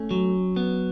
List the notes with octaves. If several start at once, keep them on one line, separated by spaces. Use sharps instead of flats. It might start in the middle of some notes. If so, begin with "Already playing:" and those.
Already playing: A3 C#4
F#3
B3